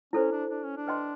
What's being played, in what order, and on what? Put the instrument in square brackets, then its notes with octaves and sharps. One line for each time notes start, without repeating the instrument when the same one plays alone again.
[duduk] C#4 [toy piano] E4 A4 C5
[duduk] D4
D4
C#4
D4
[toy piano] B4 D#5 G5 C6